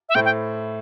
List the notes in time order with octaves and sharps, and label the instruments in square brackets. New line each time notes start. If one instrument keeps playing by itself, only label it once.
[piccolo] E5
[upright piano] A2 A3 E4 C5 [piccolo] G5
[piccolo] G5